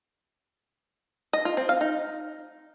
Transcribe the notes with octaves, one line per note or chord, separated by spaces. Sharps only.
D#5
F4
C4
F5
D#4